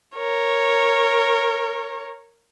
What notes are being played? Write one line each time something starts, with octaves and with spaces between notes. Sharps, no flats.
A#4 C#5